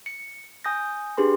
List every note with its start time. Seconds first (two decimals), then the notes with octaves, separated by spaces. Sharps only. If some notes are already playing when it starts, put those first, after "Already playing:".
0.06 C#7
0.64 G#5 D#6 G6 A#6
1.17 D4 G4 G#4 B4 C6